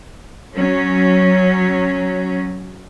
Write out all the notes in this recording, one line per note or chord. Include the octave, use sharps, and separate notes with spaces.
F#3 C#4